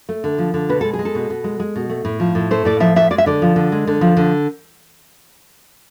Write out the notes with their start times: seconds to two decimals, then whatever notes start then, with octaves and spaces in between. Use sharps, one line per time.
0.09 A3
0.24 D3
0.38 F3
0.54 D3
0.69 B2 B4
0.81 G#3 A4
0.93 G#4
0.99 G#3
1.05 A4
1.15 B2
1.30 B2
1.44 G#3
1.60 G#3
1.76 B2
1.90 A3
2.05 A2
2.20 F3
2.35 A2
2.51 A3 C5
2.65 A2 D5
2.80 F3 E5
2.96 A2 E5
3.11 G#3 D5
3.18 E5
3.26 D3 D5
3.42 F3
3.56 D3
3.72 G#3
3.87 D3
4.01 F3
4.17 D3